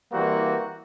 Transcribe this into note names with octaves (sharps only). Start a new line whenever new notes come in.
E3 G3 A#3 C4 F#4